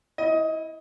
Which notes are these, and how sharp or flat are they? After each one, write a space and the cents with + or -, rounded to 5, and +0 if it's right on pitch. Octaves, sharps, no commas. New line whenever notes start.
E4 -15 D#5 +20